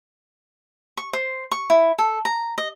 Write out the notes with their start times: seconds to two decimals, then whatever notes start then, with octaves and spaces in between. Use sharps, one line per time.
0.97 C#6
1.13 C5
1.51 C#6
1.70 E4
1.98 A4
2.25 A#5
2.58 D#5